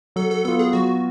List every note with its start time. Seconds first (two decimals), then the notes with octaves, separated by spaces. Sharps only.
0.16 F#3 A4
0.31 A4
0.45 B3 F4 A4
0.59 G#4
0.73 F#3 F#4